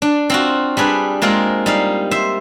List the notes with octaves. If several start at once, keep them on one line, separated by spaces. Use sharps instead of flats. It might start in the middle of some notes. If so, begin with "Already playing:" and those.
D4
C4 F4 F#4
G3 D4 G#4 B4
G#3 A#3 C4 F4
G3 D#4 F5
C5 E5